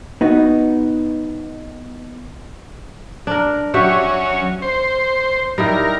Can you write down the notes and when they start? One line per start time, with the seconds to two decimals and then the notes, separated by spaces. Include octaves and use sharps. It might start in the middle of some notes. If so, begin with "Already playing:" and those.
0.21 B3 D#4 F#4
3.27 D4 A#4
3.74 F#3 C#4 F#4 G4 E5
4.62 C5
5.58 G3 D#4 E4 A#4